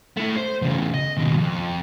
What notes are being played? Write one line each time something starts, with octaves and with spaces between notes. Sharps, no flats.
A3 E4
C5
E2 C#3
D#5
D#2 B2
F2